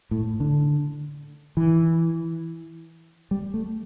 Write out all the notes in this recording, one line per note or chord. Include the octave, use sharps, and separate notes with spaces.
A2
D3
E3
G3
A3